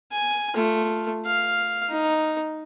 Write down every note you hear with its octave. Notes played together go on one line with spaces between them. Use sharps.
G#5
A3 F4
F5
D#4